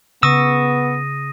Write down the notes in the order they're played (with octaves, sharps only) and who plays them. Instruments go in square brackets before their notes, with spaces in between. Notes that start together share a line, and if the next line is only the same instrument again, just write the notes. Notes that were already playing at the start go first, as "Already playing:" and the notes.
[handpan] C#3 [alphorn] B3 [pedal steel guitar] C#6 E6 [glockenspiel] D#6 A#6 D#7